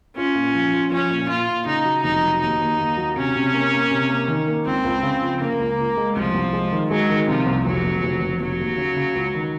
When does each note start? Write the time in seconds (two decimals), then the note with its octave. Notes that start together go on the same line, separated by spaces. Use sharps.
0.16 C#4 F4
0.35 A#2
0.55 F3
0.73 F4
0.91 F3 C#4
1.10 A#2
1.29 A#2 F4
1.48 A#2
1.66 C#3 D#4
1.85 F#3
2.04 F1 D#4
2.23 F#3
2.41 D#2 D#4
2.61 D#2
2.79 D#2
2.98 F#3
3.16 C3 C#4
3.35 C3
3.54 A#3
3.73 A#3
3.91 C3
4.09 A#3
4.28 D#3
4.47 A#3
4.66 C#2 C4
4.84 C#2
5.03 C#3
5.22 F3
5.41 C#3 A#3
5.59 C#2
5.78 C#2
5.97 G#3
6.16 C2 F3
6.34 C2
6.53 G#3
6.72 D#3
6.90 F#3 G#3
7.10 D#3
7.28 C3 F3
7.46 C2
7.65 F1 F#3
7.84 F1
8.03 F1
8.21 F1
8.40 F1 F#3
8.60 D#2
8.77 C#3
8.96 C#3
9.15 C#2
9.35 D#3